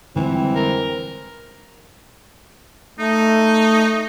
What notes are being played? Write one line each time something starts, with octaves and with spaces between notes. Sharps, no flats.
F2 D3 E3 G3 G#3 C4
A#4
A3 D#4